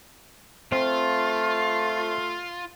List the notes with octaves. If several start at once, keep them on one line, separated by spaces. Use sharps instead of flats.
A3 C4 F4